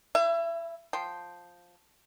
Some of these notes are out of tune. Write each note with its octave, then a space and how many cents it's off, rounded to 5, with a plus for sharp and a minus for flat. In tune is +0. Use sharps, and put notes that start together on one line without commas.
E4 +0 E5 +30
F3 +10 G5 +0 C6 +0